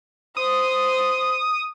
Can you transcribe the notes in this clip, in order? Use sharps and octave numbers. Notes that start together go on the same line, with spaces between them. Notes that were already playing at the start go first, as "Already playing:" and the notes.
C5 D#6